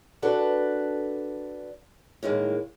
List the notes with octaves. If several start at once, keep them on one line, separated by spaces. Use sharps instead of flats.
D4 F#4 A4 B4
A2 D#3 G#3 A#3